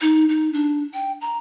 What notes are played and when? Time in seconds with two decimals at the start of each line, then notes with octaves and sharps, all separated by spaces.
0.01 D#4
0.29 D#4
0.53 D4
0.94 G5
1.21 A#5